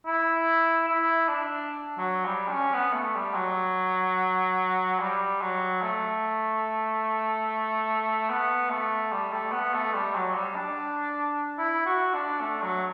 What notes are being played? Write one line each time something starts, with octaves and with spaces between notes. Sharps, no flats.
E4
E4
D4
F#3
G3
D4
C#4
B3
A3
G3
F#3
G3
F#3
A3
B3
A3
G3
A3
B3
A3
G3
F#3
G3
D4
E4
F#4
D4
A3
F#3